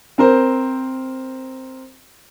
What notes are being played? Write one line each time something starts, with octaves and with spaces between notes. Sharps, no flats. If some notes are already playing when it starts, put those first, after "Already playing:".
C4 A#4 C5